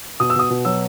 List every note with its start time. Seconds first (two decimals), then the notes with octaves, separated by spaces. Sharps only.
0.20 B2 D#6
0.30 E6
0.36 B2 D#6
0.50 B2
0.65 F#3 E6